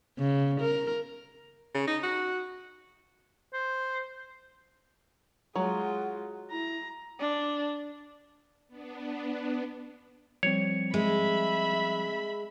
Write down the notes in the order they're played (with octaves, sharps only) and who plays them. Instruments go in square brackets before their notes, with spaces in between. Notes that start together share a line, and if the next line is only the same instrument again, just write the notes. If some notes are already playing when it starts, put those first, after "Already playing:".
[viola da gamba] C#3
A#4
[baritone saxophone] C#3
D#4
F#4
[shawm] C5
[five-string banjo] F#3 [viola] G#3 F4 [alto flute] F#5
[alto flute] E4 [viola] A#5
[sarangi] D4
[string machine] B3 D4
[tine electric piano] F3 G3 C4 [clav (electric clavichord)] C#5
[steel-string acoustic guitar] G#3 [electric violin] E5 B5